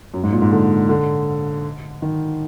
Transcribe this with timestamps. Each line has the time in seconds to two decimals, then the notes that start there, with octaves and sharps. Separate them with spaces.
0.14 F#2
0.24 G#2
0.33 A#2
0.42 G#2
0.51 D3
0.89 D3
2.02 D#3